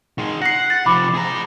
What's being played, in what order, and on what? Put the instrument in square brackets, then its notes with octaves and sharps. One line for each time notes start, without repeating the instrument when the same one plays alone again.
[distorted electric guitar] D#3 G#3
[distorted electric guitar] F#5 [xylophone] A#6 C7
[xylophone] F#6 A6
[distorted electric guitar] C3 F3 [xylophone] B5 D6
[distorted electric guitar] G#4 A#5